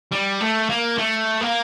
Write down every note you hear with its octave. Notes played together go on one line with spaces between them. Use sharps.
G3
A3
A#3
A3
A#3